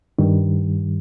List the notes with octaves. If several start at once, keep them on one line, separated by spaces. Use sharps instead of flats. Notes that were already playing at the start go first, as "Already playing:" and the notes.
G2 D#3 G3